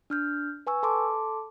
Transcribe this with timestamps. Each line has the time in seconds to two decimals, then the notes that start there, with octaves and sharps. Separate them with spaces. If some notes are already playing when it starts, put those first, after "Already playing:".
0.10 D4 F6 G6
0.67 B4 G#5 C#6 E6
0.83 A4 A5 C6 D6